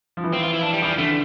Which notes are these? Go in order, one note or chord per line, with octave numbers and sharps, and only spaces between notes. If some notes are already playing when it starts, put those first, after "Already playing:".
F3
E3
C4
F4
E4
D4
G3
E3 F3
D3 A3